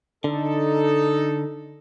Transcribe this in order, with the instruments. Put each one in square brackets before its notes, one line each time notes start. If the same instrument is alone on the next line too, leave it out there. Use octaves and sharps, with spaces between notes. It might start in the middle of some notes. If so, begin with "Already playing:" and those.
[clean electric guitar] D3 [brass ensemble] D#4 A4